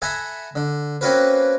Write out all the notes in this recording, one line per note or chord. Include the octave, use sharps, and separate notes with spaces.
A4 E5 F#5 G#5 A#5 B5
D3
A#3 C4 C#4 F#4 A#4 B4